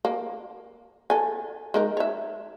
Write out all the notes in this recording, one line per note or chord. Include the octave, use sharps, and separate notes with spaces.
A#3
A4 G#5
G#3 D#4 A#4
C#5 E5